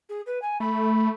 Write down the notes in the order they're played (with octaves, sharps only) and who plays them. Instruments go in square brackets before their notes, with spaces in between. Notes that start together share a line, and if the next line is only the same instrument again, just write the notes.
[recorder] G#4
B4
G#5
[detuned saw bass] A3 [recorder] B5